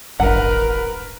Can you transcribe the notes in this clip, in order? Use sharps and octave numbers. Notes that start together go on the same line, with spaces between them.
D1 G#1 G2 A#4 B4 F#5